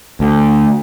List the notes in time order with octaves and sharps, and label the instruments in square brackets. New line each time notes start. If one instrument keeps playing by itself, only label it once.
[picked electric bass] D2